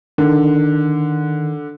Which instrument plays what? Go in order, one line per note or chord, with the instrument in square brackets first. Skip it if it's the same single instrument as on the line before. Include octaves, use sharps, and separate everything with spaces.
[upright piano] D3 [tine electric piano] D#3